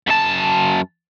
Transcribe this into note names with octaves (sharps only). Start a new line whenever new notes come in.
F#2 A5